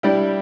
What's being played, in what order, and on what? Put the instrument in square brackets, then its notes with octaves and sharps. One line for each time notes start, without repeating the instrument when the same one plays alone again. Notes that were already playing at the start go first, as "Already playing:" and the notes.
[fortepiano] G3 D4 G4 [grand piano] E4